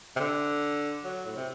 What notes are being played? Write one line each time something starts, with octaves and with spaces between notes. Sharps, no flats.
C3
D3
F#3
A2
C3